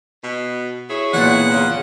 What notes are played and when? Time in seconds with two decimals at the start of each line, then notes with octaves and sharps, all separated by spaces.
0.23 B2
0.90 E4 G#4 C#5
1.13 E2 A#2 F#5
1.51 C#3